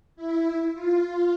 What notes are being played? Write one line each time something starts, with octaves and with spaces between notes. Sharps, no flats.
E4
F4